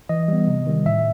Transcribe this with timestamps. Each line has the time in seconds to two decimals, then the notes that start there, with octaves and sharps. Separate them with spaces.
0.09 E3 D#5
0.28 G3 B3
0.48 C3
0.67 D#3 G3
0.86 A2 E5